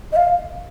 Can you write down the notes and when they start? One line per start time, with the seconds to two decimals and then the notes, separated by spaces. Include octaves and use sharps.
0.12 D#5
0.16 F5